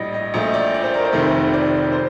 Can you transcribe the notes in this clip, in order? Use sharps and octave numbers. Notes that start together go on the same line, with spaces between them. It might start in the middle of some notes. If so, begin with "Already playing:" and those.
Already playing: A#1 A2 G3 D5 D#5
D#5
A#1 A#2 A3 D#5
D5
D5
C5
A#4
C5
F1 F2 C3 D#3 A3
D5
C5